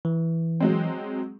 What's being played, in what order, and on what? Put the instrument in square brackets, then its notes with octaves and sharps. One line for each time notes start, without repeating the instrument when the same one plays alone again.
[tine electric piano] E3
[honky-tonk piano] F#3 G#3 C4